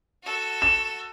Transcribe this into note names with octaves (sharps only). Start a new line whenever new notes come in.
F#4 A4
E7